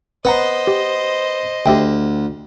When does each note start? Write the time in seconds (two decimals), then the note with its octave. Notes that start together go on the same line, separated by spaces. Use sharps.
0.25 B3 B4 C5 D#5 F#5 A#5
0.67 G4
1.66 D2 G4 E5 G5